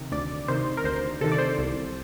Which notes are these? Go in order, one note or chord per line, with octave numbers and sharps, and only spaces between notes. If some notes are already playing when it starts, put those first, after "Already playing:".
Already playing: C3 D#3
D2 D5
C3 D#3 C5
A#4
D2 C5
C3 D#3 A4
D5
C5
C2